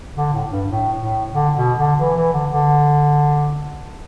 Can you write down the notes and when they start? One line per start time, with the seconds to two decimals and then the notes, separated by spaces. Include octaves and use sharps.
0.17 D3
0.33 A2
0.51 G2
0.68 A2
1.00 A2
1.33 D3
1.56 B2
1.78 D3
2.00 E3
2.16 E3
2.33 D3
2.50 D3